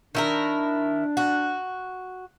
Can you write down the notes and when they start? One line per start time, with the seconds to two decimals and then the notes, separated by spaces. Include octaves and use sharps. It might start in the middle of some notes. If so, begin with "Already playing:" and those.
0.15 D#3 D4 E4 A#4
1.17 F#4